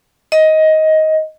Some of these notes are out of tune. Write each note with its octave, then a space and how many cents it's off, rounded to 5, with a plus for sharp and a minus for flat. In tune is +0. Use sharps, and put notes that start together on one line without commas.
D#5 +15